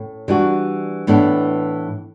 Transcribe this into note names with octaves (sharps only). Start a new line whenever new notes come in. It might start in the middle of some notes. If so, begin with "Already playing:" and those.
Already playing: A2 C#4
E3 G3 D4 F#4
A2 E3 B3 D4